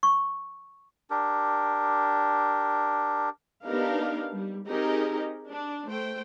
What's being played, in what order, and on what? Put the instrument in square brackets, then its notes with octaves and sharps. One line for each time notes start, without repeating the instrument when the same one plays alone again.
[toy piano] C#6
[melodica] D4 G4 A#4
[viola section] B3 D4 D#4 G4 A#4 F5
G3
C4 D#4 G4 G#4 A#4 D#5
D4
A3 C5 G5